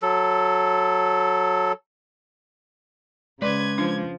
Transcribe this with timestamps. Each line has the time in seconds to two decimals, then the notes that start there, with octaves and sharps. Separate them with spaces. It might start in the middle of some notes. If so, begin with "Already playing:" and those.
0.02 F#3 A4
3.42 C#3 G#3 B4 D5 C6 D6 G#6
3.78 F3 D4